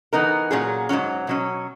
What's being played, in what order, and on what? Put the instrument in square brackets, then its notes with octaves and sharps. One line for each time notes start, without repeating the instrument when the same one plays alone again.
[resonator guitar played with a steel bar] E3 B3 D#4 A#4
A#2 F#3 C#4 G#4
G#2 D#3 F#3 C#4
B2 F#3 C#4